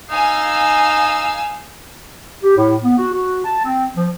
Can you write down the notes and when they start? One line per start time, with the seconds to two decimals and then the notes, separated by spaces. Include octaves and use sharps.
0.11 D#4 F5 G#5 E6
2.43 G4
2.57 A2
2.84 B3
2.98 F#4
3.13 F#4
3.45 A5
3.65 C4
3.96 F3